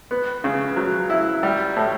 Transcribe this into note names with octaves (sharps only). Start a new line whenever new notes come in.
B3
C#3
F#3
E4
G3
A2